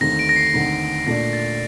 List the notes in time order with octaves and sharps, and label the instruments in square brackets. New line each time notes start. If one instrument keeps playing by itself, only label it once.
[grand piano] D#2 D3 A3 C4 D#4 [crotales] A#6
[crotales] D7
A#6
C7
[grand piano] D#2 D3 A3 C4 D#4
[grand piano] A#2 A3 D4 [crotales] A#6
[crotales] A6